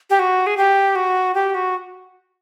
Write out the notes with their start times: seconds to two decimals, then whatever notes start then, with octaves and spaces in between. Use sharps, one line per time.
0.10 G4
0.19 F#4
0.46 G#4
0.57 G4
0.95 F#4
1.34 G4
1.54 F#4